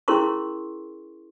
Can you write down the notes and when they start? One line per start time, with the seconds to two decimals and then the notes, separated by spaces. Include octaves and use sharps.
0.08 C#4 E4 G#4 A#4 C6 C#6